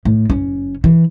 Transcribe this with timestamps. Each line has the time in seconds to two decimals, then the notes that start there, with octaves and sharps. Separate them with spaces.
0.05 A2
0.30 F#1 C#4
0.84 E3